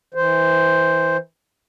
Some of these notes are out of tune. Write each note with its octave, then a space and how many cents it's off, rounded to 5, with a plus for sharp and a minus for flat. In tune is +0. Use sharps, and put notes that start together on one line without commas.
E3 -20 C5 -5